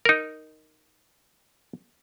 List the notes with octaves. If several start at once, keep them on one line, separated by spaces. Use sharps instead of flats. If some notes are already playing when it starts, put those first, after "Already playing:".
D#4 A#4